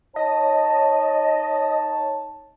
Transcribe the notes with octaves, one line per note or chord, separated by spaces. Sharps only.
D#4 C#5 D#5 A5